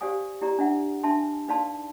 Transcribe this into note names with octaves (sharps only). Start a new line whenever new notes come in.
G4 C5 D5 F5 G#5 D#6
E4 G4 D5 A#5
D4 E5 F#5
D4 E5 G#5 A5 C6
D#4 B4 D5 F5 A5 C6